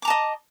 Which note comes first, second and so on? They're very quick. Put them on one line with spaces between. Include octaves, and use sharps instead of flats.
D6 A#5 A5 D#5